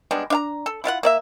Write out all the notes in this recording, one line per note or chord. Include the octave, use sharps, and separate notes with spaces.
G3 G#3 B3 D4
D4 F5 A#5
A4
E4 F4 F5 F#5
A#3 D5 E5